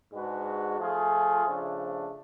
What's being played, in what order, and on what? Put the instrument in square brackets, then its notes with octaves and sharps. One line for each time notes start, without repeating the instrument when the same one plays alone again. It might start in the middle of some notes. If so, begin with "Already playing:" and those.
[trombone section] G#2 G#3 D4 F#4 B4
F3 A3 F4 G#4
C#3 F3 A3 D4